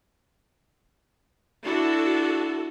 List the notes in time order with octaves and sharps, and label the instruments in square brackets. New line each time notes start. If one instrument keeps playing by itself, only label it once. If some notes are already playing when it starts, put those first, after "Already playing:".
[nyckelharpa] D4 E4 [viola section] F#4 A4